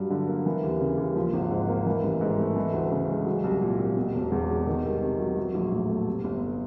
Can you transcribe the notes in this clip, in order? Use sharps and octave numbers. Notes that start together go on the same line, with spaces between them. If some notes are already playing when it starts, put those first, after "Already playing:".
Already playing: G2 F#3
D3
A#3
E3
D#2
C#3
D#2
F3
G#1
G#2
A#3
E3
A1
G#2
A3
E3
D2
C#3
G#3
F#3
C2
A#2
C2
B2
E1
E2
G#3
D#3
C2
C3
F#3
F#3
A#1
A2
A3
C3
G1